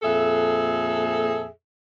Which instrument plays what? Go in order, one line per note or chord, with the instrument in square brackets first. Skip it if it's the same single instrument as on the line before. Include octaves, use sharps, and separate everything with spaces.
[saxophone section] F2 A#2 G#4 A4 E5